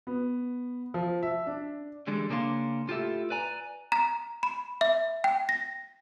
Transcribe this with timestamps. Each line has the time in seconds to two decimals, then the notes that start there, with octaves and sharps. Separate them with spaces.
0.07 B3
0.94 F3
1.23 E5
1.47 D4
2.07 D3 E3 G3 G#3 D4
2.30 C#3 A#3 C#4 D4 F5 C6
2.88 A2 F4 G4 A4 E5
3.30 B4 D5 G#5 A#5
3.92 A#5
4.43 B5
4.81 E5
5.24 G5
5.49 A#6